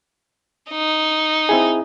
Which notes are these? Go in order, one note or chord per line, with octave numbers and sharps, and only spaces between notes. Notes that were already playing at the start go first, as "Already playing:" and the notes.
D#4
C4 E4 G#4